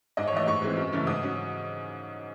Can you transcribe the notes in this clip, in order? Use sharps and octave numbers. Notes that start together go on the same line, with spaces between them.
G#2 D#5
C#5
E3 A3 D#5
G#2 C#6
E3 G#3 C4
F#2
C#3 E3 A3 C#4
G#2 D#6
F#3 C#4